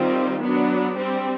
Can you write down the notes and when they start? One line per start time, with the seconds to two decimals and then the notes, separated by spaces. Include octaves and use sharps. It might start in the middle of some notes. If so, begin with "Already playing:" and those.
Already playing: D#3 G3 C4 F4
0.41 F#3 B3 D4
0.95 G3 C4